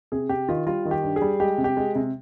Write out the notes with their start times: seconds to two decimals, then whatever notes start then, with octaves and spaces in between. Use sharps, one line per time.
0.12 C3 G#4
0.29 C3 G4
0.49 D#3 F4
0.66 G3 F4
0.85 D#3
0.91 G4
1.03 G2
1.16 G#4
1.22 G3
1.40 G#3 G4
1.58 C3
1.64 G4
1.77 G#3
1.95 C3